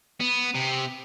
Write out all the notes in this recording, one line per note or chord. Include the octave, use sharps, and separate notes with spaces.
B3
C3